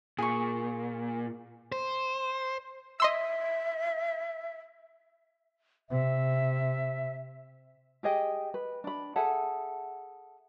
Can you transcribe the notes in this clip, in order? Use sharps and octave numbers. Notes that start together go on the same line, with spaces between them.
A#2 G#4 C#6
C5
D#5 E5 C6 E6
C3 E5
G4 G#4 D#5 G5
B4
D4 B5
G#4 A4 E5 F#5